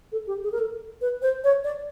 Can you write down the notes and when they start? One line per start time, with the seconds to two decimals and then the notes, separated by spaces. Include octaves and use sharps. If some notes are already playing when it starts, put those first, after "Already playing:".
0.12 A4
0.27 G4
0.44 G#4
0.52 A#4
0.59 A4
1.01 B4
1.22 C5
1.44 C#5
1.64 D5